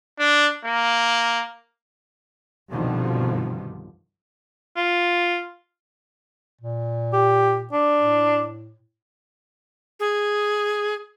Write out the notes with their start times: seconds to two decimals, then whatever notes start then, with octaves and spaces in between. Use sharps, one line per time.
0.19 D4
0.65 A#3
2.71 C2 G2 B2 D3 D#3 F3
4.77 F4
6.61 A#2
7.13 G4
7.72 D4
7.96 A2
10.00 G#4